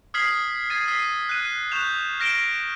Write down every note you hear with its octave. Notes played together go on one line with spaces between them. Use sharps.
D#6 F6 G#6 B6 C7 F#7
G#6 A6 C7 D#7
E6 B6 C7 D#7
F#6 D#7
C#6 F#6 G6 E7 F7
F6 A#6 D7 E7 G7